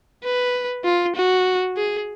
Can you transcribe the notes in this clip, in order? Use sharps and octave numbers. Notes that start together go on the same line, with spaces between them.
B4
F4
F#4
G#4